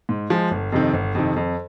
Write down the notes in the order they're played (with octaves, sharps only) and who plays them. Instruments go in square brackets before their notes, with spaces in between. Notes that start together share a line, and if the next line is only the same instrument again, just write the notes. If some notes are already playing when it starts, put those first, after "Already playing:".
[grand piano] G#2
F3 G#3
G1
F2 C3 D#3
G1
F2 C3 D#3
F2